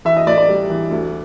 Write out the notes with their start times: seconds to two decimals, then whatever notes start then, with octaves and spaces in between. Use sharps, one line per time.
0.05 E3 E5
0.17 D#5
0.26 A2 D5
0.38 D5
0.48 G3
0.70 E3
0.91 D2